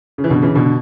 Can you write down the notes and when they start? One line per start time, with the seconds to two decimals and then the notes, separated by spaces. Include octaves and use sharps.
0.18 C#3
0.24 E3
0.30 B2 D3
0.42 C#3 E3
0.55 B2 D3
0.66 D3